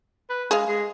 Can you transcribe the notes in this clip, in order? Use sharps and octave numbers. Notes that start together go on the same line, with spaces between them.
B4
G#3 G#4 F5
G#3